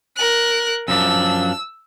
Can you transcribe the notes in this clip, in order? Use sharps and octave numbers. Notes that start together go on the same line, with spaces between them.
A#4 F#6
F#2 F3 D4 E6